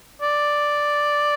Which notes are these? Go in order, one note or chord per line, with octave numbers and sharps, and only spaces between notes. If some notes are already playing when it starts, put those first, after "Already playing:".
D5